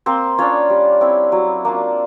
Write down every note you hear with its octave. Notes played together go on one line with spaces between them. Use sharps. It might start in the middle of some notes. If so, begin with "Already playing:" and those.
A#3 C4 C5
C#4 D4 F4 C#5
G3
C4 E4
F#3
A#3 D4 F4